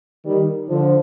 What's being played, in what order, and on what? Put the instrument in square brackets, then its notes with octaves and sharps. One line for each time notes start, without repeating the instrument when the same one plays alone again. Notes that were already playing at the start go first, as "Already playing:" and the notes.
[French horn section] D#3 G3
D3 F3